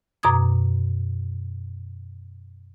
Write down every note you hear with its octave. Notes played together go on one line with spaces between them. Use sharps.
F#2 B2 A#5 D6 D#6 G#6